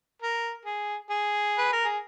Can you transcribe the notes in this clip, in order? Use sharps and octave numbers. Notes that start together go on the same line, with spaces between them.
A#4
G#4
G#4
B4
A#4
G#4